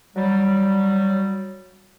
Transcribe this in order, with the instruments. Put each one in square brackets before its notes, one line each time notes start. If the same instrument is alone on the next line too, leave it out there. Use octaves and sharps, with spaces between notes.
[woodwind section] F#3 G3